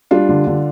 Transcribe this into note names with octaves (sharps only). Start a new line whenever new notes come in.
G3 D4 F4
D3
D3